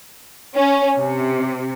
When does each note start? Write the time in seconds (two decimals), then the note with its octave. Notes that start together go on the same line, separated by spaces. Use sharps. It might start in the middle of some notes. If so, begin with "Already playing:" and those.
0.55 C#4
0.99 C3